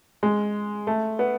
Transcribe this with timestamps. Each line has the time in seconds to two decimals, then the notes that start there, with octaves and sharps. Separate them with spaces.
0.23 G#3
0.87 A3
1.19 B3